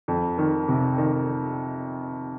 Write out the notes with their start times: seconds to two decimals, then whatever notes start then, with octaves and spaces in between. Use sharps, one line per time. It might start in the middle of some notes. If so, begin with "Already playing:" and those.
0.08 F2
0.38 D#3
0.68 C3
0.98 D#3